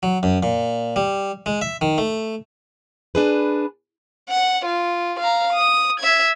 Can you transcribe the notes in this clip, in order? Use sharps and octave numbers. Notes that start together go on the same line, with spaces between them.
F#3
F#2
A#2
G3
G#3
E5
D#3
A3
D4 G#4 B4
F#5
F4
F5 A#5
D#6
E5 G#6